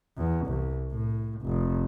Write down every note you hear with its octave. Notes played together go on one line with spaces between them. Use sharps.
E2
C2
A2
F1